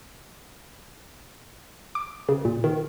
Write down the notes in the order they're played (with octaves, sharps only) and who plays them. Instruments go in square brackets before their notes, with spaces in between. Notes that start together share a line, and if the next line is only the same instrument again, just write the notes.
[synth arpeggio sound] D6
C#3
A#2
D#3